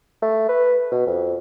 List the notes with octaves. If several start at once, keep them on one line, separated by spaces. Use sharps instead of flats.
A3
B4
B2
F2